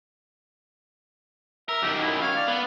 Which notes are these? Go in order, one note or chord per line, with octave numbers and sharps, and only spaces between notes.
A#4 E5
F#2 D#3 G4
E4
C#5 F5
D5
B3